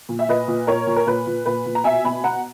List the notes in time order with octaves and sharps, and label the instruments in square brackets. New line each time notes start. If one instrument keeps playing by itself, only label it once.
[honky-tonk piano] A#2
E5
A#2 B4 D#5
A#2
A#2 A#4 C#5
A#2
A#4
A#2 B4
A#2
A#2 B4
A#2
A#5
B2 E5 G#5
B2 G#5 B5
B2 F#5 A#5